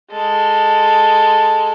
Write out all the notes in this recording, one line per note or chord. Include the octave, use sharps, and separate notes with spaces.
G#3 A4